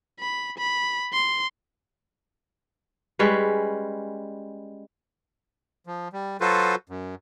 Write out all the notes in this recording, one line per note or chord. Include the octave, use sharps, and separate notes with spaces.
B5
B5
C6
G3 G#3 C#4 B4
F3
G3
F#3 F4 F#4 A4 B4 C5
F#2